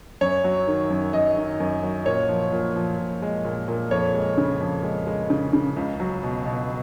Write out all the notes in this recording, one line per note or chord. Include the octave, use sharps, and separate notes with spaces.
F#2 C#5
F#3
D#3
F#2
F#2 D#5
D#3
F#2
F#3
A#2 C#5
F3
A#2
F3
A#2
G#3
A#2
A#2
F2 C#5
G#3
C#3
F2
G#3
G#3
C#3
C#3
C#2
F#3
B2
B2